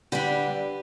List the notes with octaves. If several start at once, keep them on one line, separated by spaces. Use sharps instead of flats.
D3 G3 D4 G4 B4